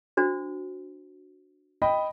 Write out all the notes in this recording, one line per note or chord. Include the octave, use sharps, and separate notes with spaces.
D4 F#4 C5
D#5 G5 B5